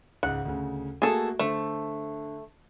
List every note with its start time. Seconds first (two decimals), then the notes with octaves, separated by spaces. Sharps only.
0.23 C#2 G#2 F#5
0.45 D2 C#3
1.02 A3 A#3 F#4 G#4 A4
1.39 D3 A3 C5